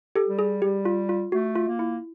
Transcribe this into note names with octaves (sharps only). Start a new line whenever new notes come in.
G4 A4
G3
G#4
G3 G4
F4
F4
A3 F#4
F4
A#3
E4